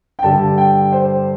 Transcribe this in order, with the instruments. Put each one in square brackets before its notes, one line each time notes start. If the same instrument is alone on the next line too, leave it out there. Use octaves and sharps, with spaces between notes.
[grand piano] G5
G2 D3 G3 A5
G5
C5